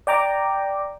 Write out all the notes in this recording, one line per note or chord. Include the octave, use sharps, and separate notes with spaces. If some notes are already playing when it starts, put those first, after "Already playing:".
D5 G5 A#5 D6